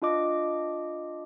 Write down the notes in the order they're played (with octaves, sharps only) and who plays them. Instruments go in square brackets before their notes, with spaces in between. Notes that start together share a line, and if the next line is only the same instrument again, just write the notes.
[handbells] D4 F4 D#5 D6